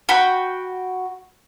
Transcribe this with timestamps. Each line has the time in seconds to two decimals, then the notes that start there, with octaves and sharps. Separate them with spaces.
0.09 F#4 G5 B5